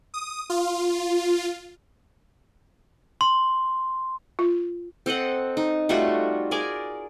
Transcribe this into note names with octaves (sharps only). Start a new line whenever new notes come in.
D#6
F4
C6
F4
C4 A4 D#5 F#5
D#4
G3 A3 F4 F#4
G#4 A#4 D5 G#5